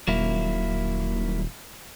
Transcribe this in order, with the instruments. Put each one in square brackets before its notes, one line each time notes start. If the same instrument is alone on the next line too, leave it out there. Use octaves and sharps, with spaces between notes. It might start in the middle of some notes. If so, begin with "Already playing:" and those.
[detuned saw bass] D#1 [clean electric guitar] F#3 A#3 E4